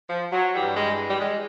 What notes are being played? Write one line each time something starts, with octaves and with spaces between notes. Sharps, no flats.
F3
F#3
G2 E3 G3
G#3
G3
G#3